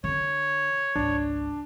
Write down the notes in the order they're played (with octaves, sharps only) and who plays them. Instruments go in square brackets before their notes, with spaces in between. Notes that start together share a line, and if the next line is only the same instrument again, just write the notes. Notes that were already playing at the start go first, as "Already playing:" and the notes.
[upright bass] D3 D4 [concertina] C#5
[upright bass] G#1 C#2 [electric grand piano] D4